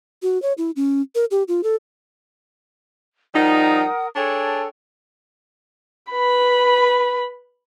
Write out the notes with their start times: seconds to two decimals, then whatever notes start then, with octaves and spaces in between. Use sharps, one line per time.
0.22 F#4
0.42 C#5
0.58 E4
0.76 C#4
1.15 A#4
1.31 G4
1.48 F4
1.63 A4
3.34 F3 G3 D#4 A#4 F#5 D#6
4.16 D4 G#4 A4 C#5 G5
6.11 B4 B5